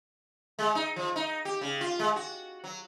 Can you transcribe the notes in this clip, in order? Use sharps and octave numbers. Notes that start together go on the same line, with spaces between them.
G#3
D#4
F3
D#4
G4
C#3
F4
G#3
F#4
F#3